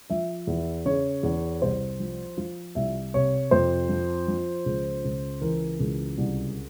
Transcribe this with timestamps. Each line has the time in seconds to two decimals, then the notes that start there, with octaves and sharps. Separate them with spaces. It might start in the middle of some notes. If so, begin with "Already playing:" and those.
0.10 F3 E5
0.47 E2
0.86 C#3 C#5
1.23 E2
1.62 C2 C5
2.00 F3
2.37 F3 F4
2.75 C2 E5
3.14 C3 C#5
3.51 F2 C5
3.89 F3
4.28 F3
4.66 C#2
5.05 C#2
5.41 E3 A#4
5.80 C#2
6.18 C2